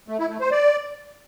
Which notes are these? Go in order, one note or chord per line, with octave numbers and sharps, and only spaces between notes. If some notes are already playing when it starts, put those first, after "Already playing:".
A3
E4
A3
C5
D5